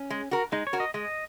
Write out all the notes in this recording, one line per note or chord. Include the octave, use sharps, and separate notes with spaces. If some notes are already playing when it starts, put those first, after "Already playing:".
Already playing: C#4
G#3
F#4 A#4
G#3 D#4
C#5
F#4 A#4
D#5
G#3 D#5